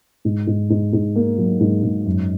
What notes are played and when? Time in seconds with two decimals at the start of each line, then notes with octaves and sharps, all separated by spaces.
0.25 G#2
0.47 G#2
0.70 G#2
0.93 G#2
1.16 A#3
1.38 F#3
1.60 G#2
1.83 G#2
2.06 F#2